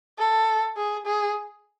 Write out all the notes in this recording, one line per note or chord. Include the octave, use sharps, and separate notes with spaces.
A4
G#4
G#4